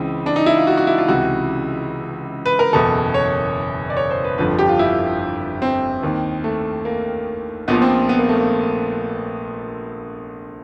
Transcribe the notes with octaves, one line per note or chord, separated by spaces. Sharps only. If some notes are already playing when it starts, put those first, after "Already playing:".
Already playing: C#2 C#3 E3 C4
D4
D#4
E4
F4
F#4
F#4
E4
F4
C#2 C3 E3 F#4
B4
A#4
F#1 E2 B2 A4
C#5
D5
C#5
C5
B4
G1 F2 D3 F3 B4
G4
F4
E4
C4
D#2 D#3
A3
A#3
A#1 A#2 F3 B3
C4
B3
A#3
A3
A#3